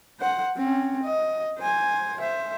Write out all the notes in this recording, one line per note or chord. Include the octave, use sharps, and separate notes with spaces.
C5 F#5
C4 C#4
D#5
C5 G#5
C5 E5